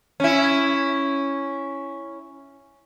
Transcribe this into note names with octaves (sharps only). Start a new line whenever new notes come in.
C#4 E4